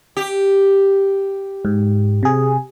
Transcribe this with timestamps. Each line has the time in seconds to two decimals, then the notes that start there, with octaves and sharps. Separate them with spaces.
0.17 G4
1.65 G#2
2.23 C3 G#4